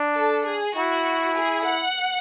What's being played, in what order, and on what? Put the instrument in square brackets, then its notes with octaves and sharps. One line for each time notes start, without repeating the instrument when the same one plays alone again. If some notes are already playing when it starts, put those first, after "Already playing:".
Already playing: [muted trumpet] D4
[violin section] A4
G#4
[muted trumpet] E4 [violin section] F#4
[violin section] G#4
F#5